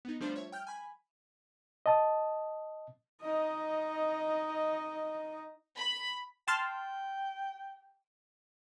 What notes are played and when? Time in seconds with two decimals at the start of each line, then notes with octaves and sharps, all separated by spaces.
0.05 B3 D#4
0.20 F3 G3 A3 D4 F4 C5
0.36 C#5 E5
0.52 G5 F6 G6
0.67 G#5 B5
1.86 D#5 A5 D#6
3.22 D#4 D#5
5.77 B5
6.48 G5 A5 C6 F6